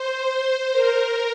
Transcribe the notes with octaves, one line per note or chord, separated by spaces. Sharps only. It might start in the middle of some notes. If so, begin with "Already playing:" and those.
Already playing: C5
A#4